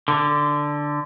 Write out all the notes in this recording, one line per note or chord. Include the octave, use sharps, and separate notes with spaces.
D3